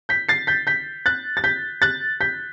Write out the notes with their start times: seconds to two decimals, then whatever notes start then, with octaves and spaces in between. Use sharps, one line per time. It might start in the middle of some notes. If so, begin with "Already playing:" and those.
0.09 G6 B6
0.29 A6 C7
0.47 G6 B6
0.67 G6 B6
1.06 F#6 A6
1.37 A6
1.44 G6 B6
1.82 F#6 A6
2.21 G6 B6